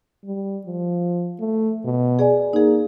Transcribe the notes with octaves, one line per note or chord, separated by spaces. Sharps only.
G3
F3
A3
B2
G#4 D5 G#5
A#3 D#4 G#4